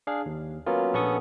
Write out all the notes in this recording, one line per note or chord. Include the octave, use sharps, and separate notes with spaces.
D4 G#4 F5
D#2
F#3 A#3 B3 C#4 F4
A#1 B3 C#4 A4 C#6 D#6